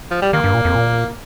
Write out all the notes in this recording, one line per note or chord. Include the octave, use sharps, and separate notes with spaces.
F3
G3
D#3 A#3
G2
A#2
F2
A#2